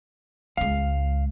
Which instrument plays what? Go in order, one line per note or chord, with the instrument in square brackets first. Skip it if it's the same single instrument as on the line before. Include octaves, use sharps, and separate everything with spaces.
[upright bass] C#2 G#3 [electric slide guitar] F5